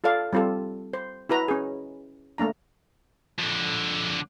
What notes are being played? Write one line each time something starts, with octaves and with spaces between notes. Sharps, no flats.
F4 A4 D5 F5
G3 C4 F4 G4 A4
C5
E4 F#4 B4 A#5
C#4 G#4
A3 A#3 D4 A#5
F2 D3